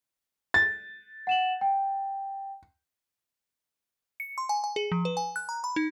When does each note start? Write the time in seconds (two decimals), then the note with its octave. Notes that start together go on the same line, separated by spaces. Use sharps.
0.54 A6
1.27 F#5 E7 F#7
1.61 G5
4.20 C#7
4.38 C6
4.49 G#5
4.64 G#5
4.76 G#4
4.92 F3
5.05 B4
5.17 G#5
5.36 F#6
5.49 A#5
5.64 B5
5.76 D#4